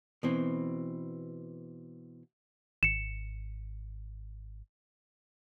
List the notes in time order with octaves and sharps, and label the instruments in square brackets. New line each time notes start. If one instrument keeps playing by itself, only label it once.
[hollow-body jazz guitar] B2 E3 C4
[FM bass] G#1 [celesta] C#7 E7